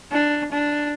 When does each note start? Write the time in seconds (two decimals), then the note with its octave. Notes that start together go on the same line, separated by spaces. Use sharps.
0.12 D4
0.52 D4